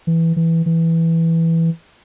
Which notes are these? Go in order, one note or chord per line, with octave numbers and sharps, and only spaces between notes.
E3
E3
E3